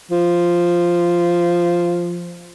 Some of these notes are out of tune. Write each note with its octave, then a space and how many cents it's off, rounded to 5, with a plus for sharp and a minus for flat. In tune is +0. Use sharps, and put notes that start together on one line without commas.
F3 -5